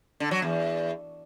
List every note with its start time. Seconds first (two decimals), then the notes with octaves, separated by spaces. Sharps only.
0.20 D3
0.31 F#3
0.42 E2